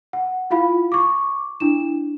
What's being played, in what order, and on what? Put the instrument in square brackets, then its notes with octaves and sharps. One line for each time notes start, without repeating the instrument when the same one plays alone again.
[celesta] F#5
E4 F4 F5 B5
C#6 D6
D4 E4 E7